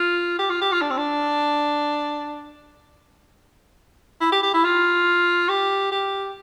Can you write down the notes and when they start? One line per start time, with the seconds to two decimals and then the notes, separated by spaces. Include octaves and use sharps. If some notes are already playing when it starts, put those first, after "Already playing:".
Already playing: F4
0.39 G4
0.50 F4
0.61 G4
0.72 F4
0.82 D4
0.90 C4
0.98 D4
4.21 E4
4.32 G4
4.43 G4
4.54 E4
4.64 F4
5.49 G4
5.92 G4